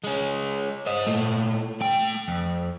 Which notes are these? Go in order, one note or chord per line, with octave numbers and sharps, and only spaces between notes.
G#3 C#4
C5 D#5
A#2 A3
A3 G5
F2